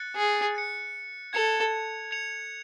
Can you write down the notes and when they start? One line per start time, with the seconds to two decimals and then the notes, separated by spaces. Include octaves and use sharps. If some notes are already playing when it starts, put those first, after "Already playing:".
Already playing: F#6 A6 C#7
0.15 G#4
0.55 F#6 A6 C#7
1.33 A4 G#6 C#7 F7
2.11 G#6 C#7 F7